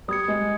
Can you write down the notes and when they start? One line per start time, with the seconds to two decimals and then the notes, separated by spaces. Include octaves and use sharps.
0.08 G3 D#6 G#6 C#7
0.28 G#3